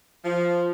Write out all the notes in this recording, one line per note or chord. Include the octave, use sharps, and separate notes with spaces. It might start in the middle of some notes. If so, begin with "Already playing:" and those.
F3